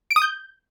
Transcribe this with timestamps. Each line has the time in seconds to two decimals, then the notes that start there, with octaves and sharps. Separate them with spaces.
0.10 D7
0.16 D#6
0.22 G6